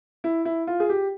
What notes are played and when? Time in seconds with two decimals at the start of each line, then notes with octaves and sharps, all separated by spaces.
0.24 E4
0.45 E4
0.67 F4
0.80 G#4
0.90 G4